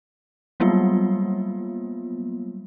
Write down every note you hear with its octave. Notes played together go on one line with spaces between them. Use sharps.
F#3 G3 A#3 B3 F4